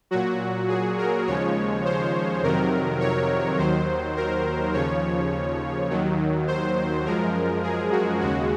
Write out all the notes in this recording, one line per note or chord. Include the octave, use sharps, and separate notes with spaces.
A#2 F#3 F#4
G#4
A#4
D#2 C#3 F3 G#3 C#5
C5
F2 C3 D#3 F#3 A#4
C#5
D#2 D#3 F#3 C5
A#4
D#2 C#3 F3 C#5
D#2 D#3 F#3
C5
F#2 F3 G#3 A#4
G#4
F#4
D#2 C#3 G#3 F#4